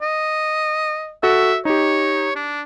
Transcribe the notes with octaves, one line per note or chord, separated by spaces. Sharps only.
D#5
F#4 A4 E5
D#4 G4 C#5
D4